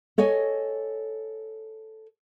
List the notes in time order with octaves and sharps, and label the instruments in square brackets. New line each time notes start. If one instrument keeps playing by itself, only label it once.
[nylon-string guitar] A4 C#5 D#5 G#5